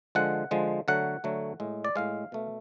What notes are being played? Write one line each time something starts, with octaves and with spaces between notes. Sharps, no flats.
D3 F3 G#3 F#5
D3 F3 G#3
D3 F#3 A3 F#5
D3 F#3 A3
A2 G#3
D5
A2 G#3 F5
B2 A3